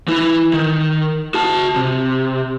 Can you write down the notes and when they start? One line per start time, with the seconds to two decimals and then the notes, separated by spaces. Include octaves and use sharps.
0.08 E3 E4
0.53 D#3
1.34 F#4 A5
1.76 C3